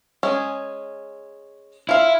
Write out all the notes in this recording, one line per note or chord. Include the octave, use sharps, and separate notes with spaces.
G#3 C#4 G#4
E4 F4 F5